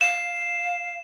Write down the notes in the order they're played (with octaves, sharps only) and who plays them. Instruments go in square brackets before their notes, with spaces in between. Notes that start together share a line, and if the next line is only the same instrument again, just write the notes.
[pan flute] F5 [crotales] E7